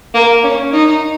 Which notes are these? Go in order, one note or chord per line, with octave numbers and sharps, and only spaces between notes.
A#3
C#4
D#4